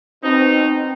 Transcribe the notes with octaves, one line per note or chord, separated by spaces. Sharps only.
B2 C4 D#4